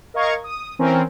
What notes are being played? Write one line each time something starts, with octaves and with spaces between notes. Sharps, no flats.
A#4 D#5 F5 A#5 C#6 G#6
D#6
E3 C4 C#4 A#4